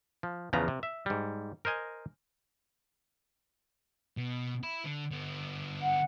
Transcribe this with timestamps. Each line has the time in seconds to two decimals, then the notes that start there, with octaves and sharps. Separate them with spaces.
0.23 F3
0.53 E2 C#3 F3 B3 A#5
0.68 C3
0.83 E5
1.06 G#2 G3
1.65 A#4 C5 D#5 G#5
4.17 B2
4.63 E5 B5
4.84 D3
5.11 D3 B3
5.82 F#5